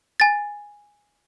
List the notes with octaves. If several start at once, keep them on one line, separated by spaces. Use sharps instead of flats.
G#5 A6